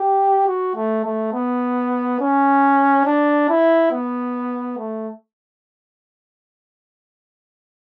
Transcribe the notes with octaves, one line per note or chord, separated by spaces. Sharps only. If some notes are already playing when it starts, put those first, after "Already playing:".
Already playing: G4
F#4
A3
A3
B3
C#4
D4
E4
B3
A3